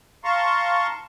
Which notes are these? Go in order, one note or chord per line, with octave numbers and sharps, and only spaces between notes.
F5 A5 A#5 C6 C#6